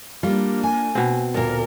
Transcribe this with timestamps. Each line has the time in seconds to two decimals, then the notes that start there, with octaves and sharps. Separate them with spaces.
0.23 G3 A#3 D4 F4
0.63 G#5
0.95 B2 C4
1.34 D2 A#2 A#4